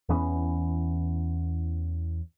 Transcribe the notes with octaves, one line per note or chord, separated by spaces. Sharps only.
E2 E3 B3 C#4